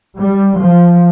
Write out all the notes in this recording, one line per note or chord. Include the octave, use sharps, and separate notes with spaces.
G3
F3